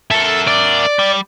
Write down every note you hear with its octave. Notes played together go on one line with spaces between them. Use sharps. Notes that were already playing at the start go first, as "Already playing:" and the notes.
A4 A#4 E5
D5
G3